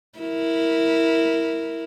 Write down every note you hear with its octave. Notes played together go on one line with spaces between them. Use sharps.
E4 A#4